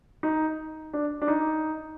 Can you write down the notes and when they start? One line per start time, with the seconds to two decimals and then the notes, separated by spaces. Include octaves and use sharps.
0.23 D#4
0.93 D4
1.22 D4
1.28 D#4